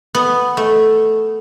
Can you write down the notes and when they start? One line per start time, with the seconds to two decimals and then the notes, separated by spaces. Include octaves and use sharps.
0.15 B3
0.57 A3